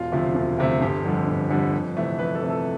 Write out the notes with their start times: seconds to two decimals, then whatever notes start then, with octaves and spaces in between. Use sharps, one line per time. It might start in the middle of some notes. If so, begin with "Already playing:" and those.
Already playing: E1 F4
0.12 D2 C3 F3 A3
0.35 E1
0.58 D2 C3 F3 A3
0.81 G1 G4
1.05 F2 D3 G3
1.28 G1
1.51 F2 D3 G3
1.73 F2
1.97 C3 E3 A3
2.19 F2 B4
2.35 A4
2.43 C3 E3 A3
2.50 A4